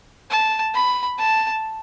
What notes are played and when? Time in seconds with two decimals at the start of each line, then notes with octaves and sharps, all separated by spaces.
0.30 A5
0.74 B5
1.19 A5